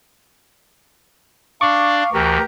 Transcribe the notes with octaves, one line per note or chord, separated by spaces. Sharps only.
D4 D5 F5 C#6 D6
D2 E3 G4 A#4 A#5